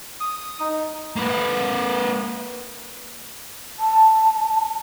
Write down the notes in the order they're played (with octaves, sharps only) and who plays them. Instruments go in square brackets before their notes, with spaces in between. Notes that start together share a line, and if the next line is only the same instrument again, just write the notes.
[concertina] D#6
D#4
[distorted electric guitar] A#3 B4
[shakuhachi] A5